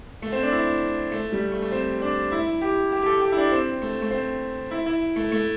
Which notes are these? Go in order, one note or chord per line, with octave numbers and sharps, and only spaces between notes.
A3
C4
D4
E4
A3
G3
A3
A3
C4
D4
E4
G4
G4
G4
A4
G4
E4
D4
C4
A3
A3
C4
E4
E4
A3
A3